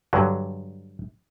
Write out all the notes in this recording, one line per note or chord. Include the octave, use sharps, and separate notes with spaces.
G2 D3 F#3